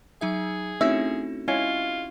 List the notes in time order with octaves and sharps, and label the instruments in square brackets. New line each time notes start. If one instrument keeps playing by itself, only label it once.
[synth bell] F#3 D#4 E5 [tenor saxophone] G#4
[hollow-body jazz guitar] A3 C#4 E4 [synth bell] C4 D#4 F#4 [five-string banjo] E5
[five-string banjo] G#3 [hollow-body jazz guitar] C#4 E4 C#5 [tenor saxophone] F4